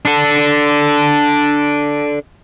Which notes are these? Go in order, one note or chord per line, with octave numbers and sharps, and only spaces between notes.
D4 A4